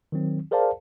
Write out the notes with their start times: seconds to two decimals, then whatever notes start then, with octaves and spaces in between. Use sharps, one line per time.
0.12 D#3 F#3 C4
0.51 G#4 A#4 C5 D5 F5 A5